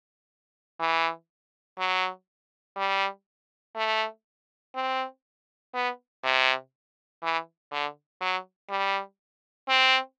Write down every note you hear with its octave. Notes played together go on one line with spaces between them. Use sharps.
E3
F#3
G3
A3
C4
B3
C3
E3
D3
F#3
G3
C4